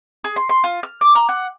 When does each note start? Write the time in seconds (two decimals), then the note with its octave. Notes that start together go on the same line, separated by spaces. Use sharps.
0.24 G#4
0.36 C6
0.49 C6
0.64 F4
0.83 F6
1.01 D6
1.15 A#5
1.29 F#5